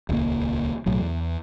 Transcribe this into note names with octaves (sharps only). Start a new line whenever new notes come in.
D#1 C#2 D#3 A#3
B1 A2 F#3
E2